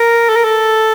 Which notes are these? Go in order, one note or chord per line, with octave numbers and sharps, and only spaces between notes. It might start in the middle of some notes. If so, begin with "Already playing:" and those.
Already playing: A#4
A4
A#4
A4